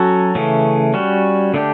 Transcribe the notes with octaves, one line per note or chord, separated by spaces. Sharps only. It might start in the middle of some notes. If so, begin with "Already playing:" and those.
Already playing: F#3 C#4 F#4 A4
C#3 E3 A3 C#4
G3 C#4 F#4
D3 A3 D4 G4